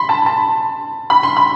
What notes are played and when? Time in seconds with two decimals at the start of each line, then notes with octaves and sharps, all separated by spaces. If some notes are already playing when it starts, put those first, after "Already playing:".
Already playing: B5 C6
0.09 A5
0.26 A5
1.10 B5
1.23 C6
1.37 B5